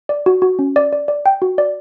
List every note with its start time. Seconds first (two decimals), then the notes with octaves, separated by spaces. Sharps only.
0.09 D5
0.26 F#4
0.42 F#4
0.59 C#4
0.76 D5
0.93 D5
1.08 D5
1.26 G5
1.42 F#4
1.58 D5